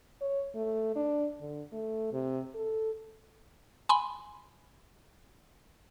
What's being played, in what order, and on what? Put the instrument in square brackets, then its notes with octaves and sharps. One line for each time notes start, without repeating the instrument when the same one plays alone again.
[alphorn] C#5
A3
D4
D3
A3
C3
A4
[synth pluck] G#5 B5 C6